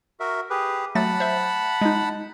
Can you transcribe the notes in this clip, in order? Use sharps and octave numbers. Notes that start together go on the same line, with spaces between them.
F#4 A#4 E5
G4 G#4 B4
F#3 A3 F#5 A5 B5 A6
C5 E5
G#3 D#4